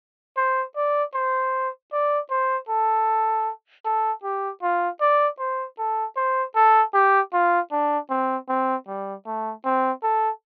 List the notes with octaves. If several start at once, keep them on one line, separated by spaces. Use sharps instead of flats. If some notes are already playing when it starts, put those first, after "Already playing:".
C5
D5
C5
D5
C5
A4
A4
G4
F4
D5
C5
A4
C5
A4
G4
F4
D4
C4
C4
G3
A3
C4
A4